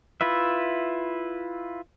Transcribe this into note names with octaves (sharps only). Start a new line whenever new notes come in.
E4 F4 B4 E5